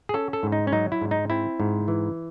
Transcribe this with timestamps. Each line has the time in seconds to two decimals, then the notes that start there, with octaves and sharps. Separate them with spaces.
0.09 G#4
0.14 C#4 A4
0.33 A4
0.43 G#2
0.52 D#4
0.67 C#4
0.72 F#3 D#4
0.92 E4
1.01 G#2
1.11 D#4
1.30 C4 E4
1.60 G#2
1.88 E3